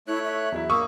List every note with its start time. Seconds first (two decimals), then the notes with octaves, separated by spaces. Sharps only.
0.08 A3 E4 C#5 F#6
0.24 E5
0.52 E2 F#3 E4
0.70 A#3 C#6 D#6 E6